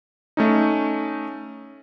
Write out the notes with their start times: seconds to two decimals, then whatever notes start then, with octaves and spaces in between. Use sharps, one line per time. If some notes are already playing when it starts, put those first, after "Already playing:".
0.37 A3 C#4 D#4